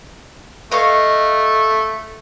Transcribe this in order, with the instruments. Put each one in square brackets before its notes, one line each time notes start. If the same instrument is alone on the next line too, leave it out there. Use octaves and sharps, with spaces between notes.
[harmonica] A3 [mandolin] D#5 F5 C#6